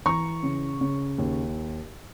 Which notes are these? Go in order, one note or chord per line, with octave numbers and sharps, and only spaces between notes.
E3 A#5 C#6
C#3
C#3
D#2